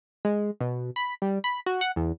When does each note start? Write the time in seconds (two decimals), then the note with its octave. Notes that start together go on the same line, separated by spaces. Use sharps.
0.25 G#3
0.61 B2
0.96 B5
1.22 G3
1.44 B5
1.66 F#4
1.81 F#5
1.96 E2